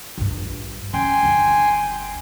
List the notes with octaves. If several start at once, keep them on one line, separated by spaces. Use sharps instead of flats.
A#1 G2
C#4 G5 G#5 C6
G1 D2